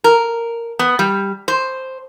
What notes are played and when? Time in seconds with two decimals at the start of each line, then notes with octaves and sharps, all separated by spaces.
0.04 A#4
0.79 B3
0.99 G3
1.48 C5